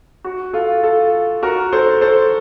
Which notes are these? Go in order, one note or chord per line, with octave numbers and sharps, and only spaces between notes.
F#4
F4 A4
F4 A4
F#4 A#4
A4 C5
A4 C5